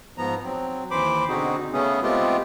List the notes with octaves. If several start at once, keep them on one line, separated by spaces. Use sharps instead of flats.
G#2 F3 B3 A#5
F#3 C4
D#2 E3 C5 B5 D6
B2 D3 C4 D#4 F#4 G#4
C#3 A3 B3 C#4 G#4
G#3 A3 B3 C4 F4 G4